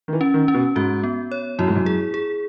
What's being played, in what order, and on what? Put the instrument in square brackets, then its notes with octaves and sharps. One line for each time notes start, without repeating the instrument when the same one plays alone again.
[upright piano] D#3
E3
[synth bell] C#4
[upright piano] D#3
[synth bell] C#4
[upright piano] B2
[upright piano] G#2 [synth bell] F#4
[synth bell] B3
C#5
[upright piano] F#2 [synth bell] E4
[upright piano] G#2
F#2
[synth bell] G#4
G#4